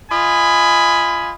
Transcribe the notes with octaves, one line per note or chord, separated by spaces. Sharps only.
F4 D#5 G#5 B5